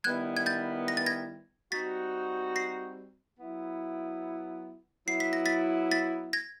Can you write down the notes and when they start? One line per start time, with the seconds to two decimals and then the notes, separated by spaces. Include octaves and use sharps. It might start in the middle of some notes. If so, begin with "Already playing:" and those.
0.04 D#3 G3 B3 E4 F#6 G#6
0.37 G#6
0.46 G6 A6
0.88 A#6
0.97 A6
1.06 G#6 A#6
1.72 G3 C4 D#4 F#4 A6 B6
2.56 A#6 C7
3.40 F#3 B3 E4
5.07 F#3 B3 E4 C7
5.20 B6
5.33 A#6
5.46 A6 B6
5.91 A6 B6
6.33 G#6 A#6